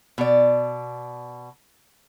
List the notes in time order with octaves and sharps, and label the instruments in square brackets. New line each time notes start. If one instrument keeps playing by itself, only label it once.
[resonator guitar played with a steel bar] B2 D5